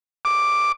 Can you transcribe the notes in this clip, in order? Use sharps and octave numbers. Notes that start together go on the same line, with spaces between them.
D6